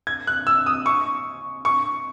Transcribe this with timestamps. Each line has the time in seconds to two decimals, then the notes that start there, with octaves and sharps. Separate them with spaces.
0.07 G#6
0.27 F#6
0.47 E6
0.66 D#6
0.86 C#6
1.65 C#6